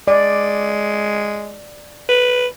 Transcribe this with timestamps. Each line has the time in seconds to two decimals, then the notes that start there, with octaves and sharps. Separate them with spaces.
0.08 G#3 D5
2.09 B4